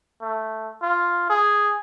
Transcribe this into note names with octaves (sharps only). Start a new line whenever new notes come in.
A3
F4
G#4